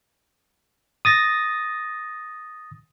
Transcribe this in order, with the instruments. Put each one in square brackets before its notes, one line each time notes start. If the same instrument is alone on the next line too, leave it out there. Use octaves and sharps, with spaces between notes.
[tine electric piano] D#6 A6 A#6